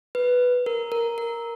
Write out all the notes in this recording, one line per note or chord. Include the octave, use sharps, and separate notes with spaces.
B4
A#4
A#4
A#4